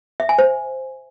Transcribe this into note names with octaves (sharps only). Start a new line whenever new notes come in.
E5
G#5
C5